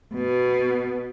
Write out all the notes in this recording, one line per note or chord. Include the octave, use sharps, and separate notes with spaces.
B2